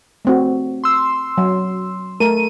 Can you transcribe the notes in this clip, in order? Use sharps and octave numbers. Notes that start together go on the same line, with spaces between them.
A3 C4 F#4
C6 E6
F#3
A3 A#4 D#7